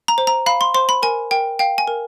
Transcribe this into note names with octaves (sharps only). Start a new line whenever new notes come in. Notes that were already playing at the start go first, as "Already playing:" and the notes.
A#5
C5
A#5
F5 B5
C6
C5 C6
B5
A#4 G#5
A#4 G5
F5 G5
G#5
A#4